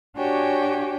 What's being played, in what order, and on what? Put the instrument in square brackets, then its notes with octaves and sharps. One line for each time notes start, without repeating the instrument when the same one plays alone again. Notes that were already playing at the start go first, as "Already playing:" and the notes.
[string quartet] D4 F#4 G4 C#5 G5 G#5